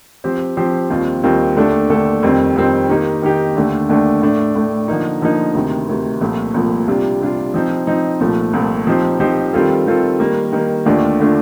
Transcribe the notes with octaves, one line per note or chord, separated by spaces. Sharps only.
F3 C4 G4 C5
F3 C4 G4 C5
D#2 D#3 G3 C4 F4
D#2 D#3 G3 C4 F4
D#2 D3 A3 D4 A4
D#2 D3 A3 D4 A4
F2 D#3 G3 C4
F2 D#3 G3 C4
D#3 A#3 D#4 G4
D#3 A#3 D#4 G4
D#2 D3 A3 D4
D#2 D3 A3 D4
A2 A3 D4
A2 A3 D4
D3 F3 A#3 D#4
D3 F3 A#3 D#4
D2 C3 D#3
D2 C3 D#3
C2 A#2 F3 A3
C2 A#2 F3 A3
C3 G3 D4 F4
C3 G3 D4 F4
F3 C4 D#4
F3 C4 D#4
C2 A#2 F3 A3
C2 A#2 F3 A3
F3 C4 D#4 G4 C5
F3 C4 D#4 G4 C5
D#3 G3 C4 F4 A4
D#3 G3 C4 F4 A4
D#3 G3 A#3
D#3 G3 A#3
D#2 D3 A3 D4 F4
D3 A3 D4 F4